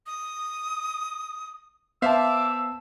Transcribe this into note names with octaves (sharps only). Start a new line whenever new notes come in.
D#6
B3 C5 E5 F5 A5 D6 E6